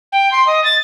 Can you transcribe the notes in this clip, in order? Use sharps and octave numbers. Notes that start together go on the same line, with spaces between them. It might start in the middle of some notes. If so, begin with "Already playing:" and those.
G5
C6
D#5
A6